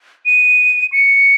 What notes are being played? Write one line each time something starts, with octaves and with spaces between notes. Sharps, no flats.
D#7
C#7